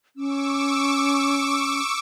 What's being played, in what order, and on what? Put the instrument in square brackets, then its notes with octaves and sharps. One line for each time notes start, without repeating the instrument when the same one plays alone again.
[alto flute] C#4 [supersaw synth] C#6 D6 E6